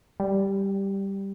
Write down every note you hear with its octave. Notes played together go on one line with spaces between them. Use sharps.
G3